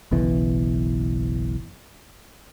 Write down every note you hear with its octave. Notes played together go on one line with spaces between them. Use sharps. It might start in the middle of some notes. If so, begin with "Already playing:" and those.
F#1 B1 B2 E3